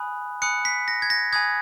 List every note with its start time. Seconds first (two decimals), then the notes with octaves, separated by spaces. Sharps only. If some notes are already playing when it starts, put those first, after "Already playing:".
Already playing: G#5 B5 D#6 F#6
0.42 G#5 B5 D#6 F#6 C#7
0.65 B6
0.88 A#6
1.02 G#6
1.10 A#6
1.32 G#5 B5 D#6 F#6 G#6